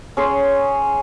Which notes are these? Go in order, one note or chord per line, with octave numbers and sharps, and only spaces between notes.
C#4 G#4 C6